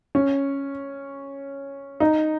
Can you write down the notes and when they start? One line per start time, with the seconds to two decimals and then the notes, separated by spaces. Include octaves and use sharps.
0.15 C#4
2.00 D#4